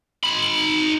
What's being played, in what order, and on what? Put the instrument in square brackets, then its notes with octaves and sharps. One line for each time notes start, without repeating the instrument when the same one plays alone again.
[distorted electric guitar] D#4 B5